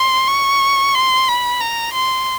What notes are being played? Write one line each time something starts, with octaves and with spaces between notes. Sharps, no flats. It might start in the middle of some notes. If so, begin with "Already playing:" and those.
Already playing: C6
C#6
C6
B5
A#5
C6